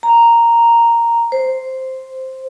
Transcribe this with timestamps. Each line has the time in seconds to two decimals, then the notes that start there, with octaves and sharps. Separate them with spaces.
0.03 A#5
1.32 C5